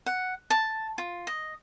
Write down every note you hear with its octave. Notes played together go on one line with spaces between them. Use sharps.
F#5
A5
F4
D#5